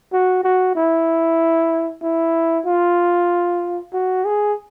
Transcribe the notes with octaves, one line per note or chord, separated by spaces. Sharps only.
F#4
F#4
E4
E4
F4
F#4
G#4